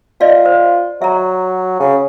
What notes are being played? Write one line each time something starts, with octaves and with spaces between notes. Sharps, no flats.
F4 D5 D#5 F5
C5
F#3 E5 A#5
C#3